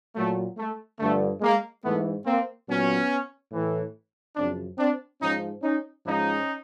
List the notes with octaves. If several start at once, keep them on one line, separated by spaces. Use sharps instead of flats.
A#2 F#3 A3
A3
G2 D3 F3 A3
G#3 A#3
G#2 E3 A3 B3
A#3 C4
A#2 F#3 B3 C#4
A2 E3
F#2 C#3 F3 C4 D4
C4 D4
G#2 F3 C#4 D#4
C#4 D#4
G#2 F3 C#4 D#4